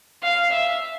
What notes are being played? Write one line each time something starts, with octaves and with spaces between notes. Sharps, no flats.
F5
E5